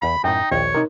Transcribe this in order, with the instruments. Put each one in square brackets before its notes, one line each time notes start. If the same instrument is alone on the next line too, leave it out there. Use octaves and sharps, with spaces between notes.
[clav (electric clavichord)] E2 F5 [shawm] B5
[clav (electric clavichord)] F#2 A2 [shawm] D#4 [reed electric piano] G5
[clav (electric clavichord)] A#1 D#2 [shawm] C#5
[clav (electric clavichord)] C3 [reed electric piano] D#4 A#4